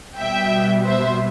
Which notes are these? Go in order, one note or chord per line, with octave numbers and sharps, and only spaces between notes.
B2 G3 B3 E5 G5
C5 E5